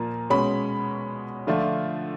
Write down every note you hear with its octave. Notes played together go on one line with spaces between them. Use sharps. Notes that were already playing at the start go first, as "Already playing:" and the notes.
Already playing: A#2 F3 A#3 A#5
B2 G#3 C#4 B5
D3 F3 A3 D4 F4